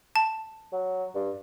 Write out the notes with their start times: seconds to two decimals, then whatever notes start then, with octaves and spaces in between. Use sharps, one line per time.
0.16 A5
0.73 F#3
1.15 G2